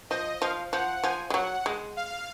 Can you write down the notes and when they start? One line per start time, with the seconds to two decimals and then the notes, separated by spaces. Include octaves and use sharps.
0.10 F3 D#5
0.42 F3 F5
0.72 F3 F#5
1.04 F3 G#5
1.30 G#3
1.34 F#3 F#5
1.66 G#3
1.97 F5